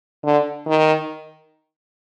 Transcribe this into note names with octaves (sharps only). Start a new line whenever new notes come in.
D3
D#3